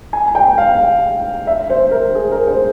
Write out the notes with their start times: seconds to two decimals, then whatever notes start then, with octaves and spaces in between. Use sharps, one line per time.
0.13 G#5
0.35 G5
0.58 F5
1.47 E5
1.70 C5
1.91 A#4
2.15 G#4
2.31 A#4
2.48 C5